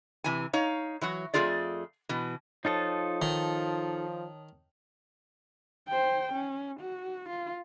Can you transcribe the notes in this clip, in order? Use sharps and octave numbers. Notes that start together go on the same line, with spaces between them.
C3 E3 G#5
D#4 C#5 F5
E3 F#3 F#4
F2 G#3 A3 F4 G#4 D5
B2 E3
F3 D#4 F4 A4 C#5 A5 D#6
D#3
C5 G5
C#4
F#4
F4